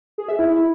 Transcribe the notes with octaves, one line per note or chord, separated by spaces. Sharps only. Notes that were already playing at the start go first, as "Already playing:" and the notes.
G#4
E5
E4